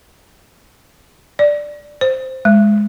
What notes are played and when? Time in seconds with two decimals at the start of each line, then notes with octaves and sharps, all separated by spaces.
1.39 D5
2.01 C5
2.45 G#3